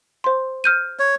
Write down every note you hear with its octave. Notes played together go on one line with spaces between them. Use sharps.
C5 C6
F6 G6 D#7
C#5